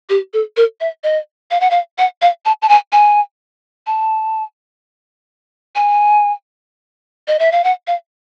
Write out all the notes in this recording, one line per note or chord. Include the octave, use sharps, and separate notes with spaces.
G4
A4
A#4
E5
D#5
F5
F#5
F5
F#5
F5
A5
A5
G#5
G#5
A5
G#5
D#5
E5
F5
F#5
F5